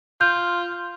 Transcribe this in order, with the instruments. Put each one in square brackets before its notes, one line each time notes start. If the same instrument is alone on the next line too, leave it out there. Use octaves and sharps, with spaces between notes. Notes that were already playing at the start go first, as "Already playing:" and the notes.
[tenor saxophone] F4 [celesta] G6